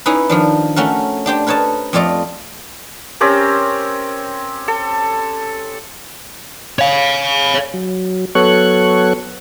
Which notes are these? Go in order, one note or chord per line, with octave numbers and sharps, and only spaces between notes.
C#4 D#4 E4 G#4 B4
D#3 F3 D4
A3 C#4 F#4 A#4
D4 G4 C5 G5
A#4 B4 C#5 D#5 A5
F2 A3 F4 D5 D#5
C4 C#4 G4 A#4
A4
C#5 F5
F#3
F#3 B3 A4 C#5 C#6 F#6